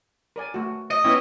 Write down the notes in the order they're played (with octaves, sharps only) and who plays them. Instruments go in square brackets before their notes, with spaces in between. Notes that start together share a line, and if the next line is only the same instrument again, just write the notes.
[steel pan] A#4 D5 G#5
A3 F#4
[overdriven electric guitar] D#5
[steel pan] B3 G5 [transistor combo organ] C#4 E4